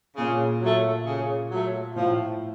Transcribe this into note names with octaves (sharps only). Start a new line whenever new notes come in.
A#2 C#3
F#3 A3
C#3
F#3 A3
A2 F3